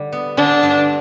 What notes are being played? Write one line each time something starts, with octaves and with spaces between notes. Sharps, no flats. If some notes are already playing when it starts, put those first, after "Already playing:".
Already playing: D3 G3
B3
D3 D4
G2